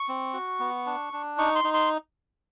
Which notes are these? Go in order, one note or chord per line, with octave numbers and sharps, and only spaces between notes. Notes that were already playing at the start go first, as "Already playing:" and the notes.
Already playing: C#6
C4
F#4
B3
D4
D4
D#4 C#6
C6
D#4
C6